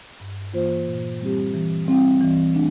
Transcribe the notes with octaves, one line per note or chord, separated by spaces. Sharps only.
G2
E3 A#3 F4 C5
A#2
G3 C4 G4
E3
G3 C4
E3
A3 D4